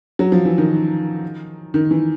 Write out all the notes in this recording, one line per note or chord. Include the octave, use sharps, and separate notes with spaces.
F#3
F3
E3
D#3
D#3
E3